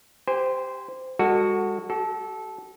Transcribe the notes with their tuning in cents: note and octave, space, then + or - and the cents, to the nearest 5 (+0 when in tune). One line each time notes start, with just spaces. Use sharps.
G4 +0 C5 -15 G#5 -35
G#3 -40 F#4 +0 A4 +15
F#4 +45 A4 -20